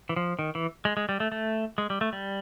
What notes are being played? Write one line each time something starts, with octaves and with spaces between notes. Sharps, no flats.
E3
F3
D#3
E3
G#3
G#3
G3
A3
A3
G#3
G3
A3
G3